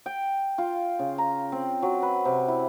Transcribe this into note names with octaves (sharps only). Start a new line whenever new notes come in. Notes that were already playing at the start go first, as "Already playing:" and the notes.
G5
F4
C#3
A#5
C4
F#3
B4
C3
E4